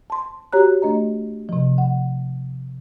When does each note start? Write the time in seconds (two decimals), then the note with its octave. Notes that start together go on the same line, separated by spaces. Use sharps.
0.10 A5 C6
0.53 F#4 G4 C#5 A#5 F#6
0.82 A3 D4 D#5 A#5
1.49 C3 F3
1.78 F#5